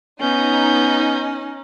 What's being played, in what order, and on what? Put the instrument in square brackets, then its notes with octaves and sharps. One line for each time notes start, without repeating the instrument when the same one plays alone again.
[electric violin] B3 G6 [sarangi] C#4 [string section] D#4